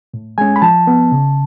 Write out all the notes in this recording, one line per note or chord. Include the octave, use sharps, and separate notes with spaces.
A2
G#3 C#4 G#5
B5
F3 A5
B3
C#3